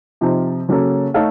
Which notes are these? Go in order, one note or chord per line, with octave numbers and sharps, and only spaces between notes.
C3 F3 C4 D#4
C#3 F#3 A#3 C#4 A4
A3 D#4 A4 C#5 F5